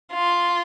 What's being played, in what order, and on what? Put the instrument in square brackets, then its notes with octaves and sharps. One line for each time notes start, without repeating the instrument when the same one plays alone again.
[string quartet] F4